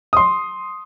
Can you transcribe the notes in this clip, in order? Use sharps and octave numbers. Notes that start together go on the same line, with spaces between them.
C6 D#6